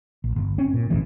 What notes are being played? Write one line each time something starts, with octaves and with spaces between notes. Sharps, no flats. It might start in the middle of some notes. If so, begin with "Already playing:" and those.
A#1
G1
C4 C#4
A#2
B1 E2 A2 E3